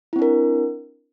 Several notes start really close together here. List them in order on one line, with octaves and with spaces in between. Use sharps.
E4 C4 D4 A#4